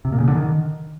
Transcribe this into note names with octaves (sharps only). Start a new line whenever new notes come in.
C3
A#2
C#3
D3
D#3